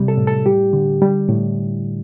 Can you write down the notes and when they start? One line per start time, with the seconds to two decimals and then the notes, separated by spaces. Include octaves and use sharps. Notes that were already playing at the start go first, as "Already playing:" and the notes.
Already playing: C3 G3
0.08 A4
0.17 A2
0.27 A4
0.46 G3 G4
0.73 D3
1.02 G3
1.29 A2